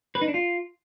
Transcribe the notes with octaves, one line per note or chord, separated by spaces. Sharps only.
B4
D#4
D4
F4